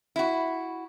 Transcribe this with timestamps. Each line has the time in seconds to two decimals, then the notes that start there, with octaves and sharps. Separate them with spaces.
0.16 E4 F#4